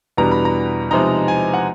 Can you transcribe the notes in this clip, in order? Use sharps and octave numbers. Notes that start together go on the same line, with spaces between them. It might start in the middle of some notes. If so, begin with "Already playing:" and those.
E2 B2 G3 B3 D4 A#5
B5
A#5
C3 F3 G#3 B3 D#4 A#5
G#5
F#5